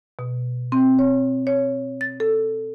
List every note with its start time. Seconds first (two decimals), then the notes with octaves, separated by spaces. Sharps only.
0.19 B2
0.72 C4
0.99 C#5
1.47 C#5
2.01 A6
2.20 A4